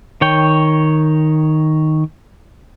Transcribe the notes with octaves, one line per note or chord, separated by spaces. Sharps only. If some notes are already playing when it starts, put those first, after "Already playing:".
D#3 C#5 G5